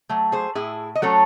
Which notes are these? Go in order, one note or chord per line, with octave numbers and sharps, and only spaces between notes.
F#3 A3
G#4 C5
A2 E4 G#4
D#5
F#3 A3 C#4 A4 C#5